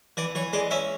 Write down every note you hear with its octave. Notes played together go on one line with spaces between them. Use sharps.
E3 D5
E3 C#5
G#3 D5
C#4 E5